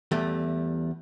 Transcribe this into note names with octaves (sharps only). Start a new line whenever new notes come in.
E2 G3 A3